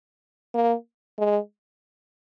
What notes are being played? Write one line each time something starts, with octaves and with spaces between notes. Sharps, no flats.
A#3
G#3